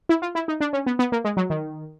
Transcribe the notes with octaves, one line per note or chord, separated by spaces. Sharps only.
E4
F4
E4
D#4
D4
C#4
B3
B3
A#3
G#3
F#3
D#3